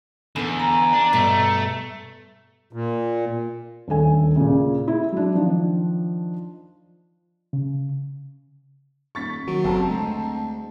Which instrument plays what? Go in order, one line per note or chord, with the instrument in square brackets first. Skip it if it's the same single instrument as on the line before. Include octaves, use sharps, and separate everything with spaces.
[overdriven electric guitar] E2 [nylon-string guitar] D3 B4
[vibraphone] A#5
[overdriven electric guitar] D4
[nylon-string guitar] G2 B2 [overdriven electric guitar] A3
[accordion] A#2
[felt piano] D#1 D2 A4 G#5
A#2 C#3
E4
F#3 D4
D#3 F3 D4
[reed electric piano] C#3
[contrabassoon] D#1 [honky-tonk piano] C#6 A6 B6
[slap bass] D#3 [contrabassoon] F#3
[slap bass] F#1 F#2 [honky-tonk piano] C4 A4 A#5
[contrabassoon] D2 [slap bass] G#3